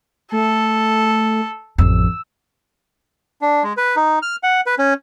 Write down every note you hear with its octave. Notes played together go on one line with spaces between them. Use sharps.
A3 A4
A1 F2 E6
D4
G#3
B4
D#4
F6
F#5
B4
C#4